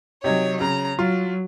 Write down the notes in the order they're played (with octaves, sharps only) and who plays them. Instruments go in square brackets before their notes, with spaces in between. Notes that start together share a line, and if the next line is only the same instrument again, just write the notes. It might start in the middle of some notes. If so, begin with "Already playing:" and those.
[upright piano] C3 D#4 G#6 [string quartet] F#3 C#5
[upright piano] C#3 [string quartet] A#5
[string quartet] F#3 [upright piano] F4